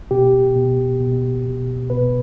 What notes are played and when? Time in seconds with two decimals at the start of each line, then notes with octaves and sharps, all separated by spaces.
0.11 B2 G4
0.56 B2
1.00 B2
1.45 B2
1.90 B2 B4